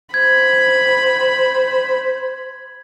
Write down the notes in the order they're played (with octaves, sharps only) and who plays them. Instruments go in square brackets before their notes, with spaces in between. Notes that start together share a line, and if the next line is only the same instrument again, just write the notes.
[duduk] C5 [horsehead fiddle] B5 [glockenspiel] G#6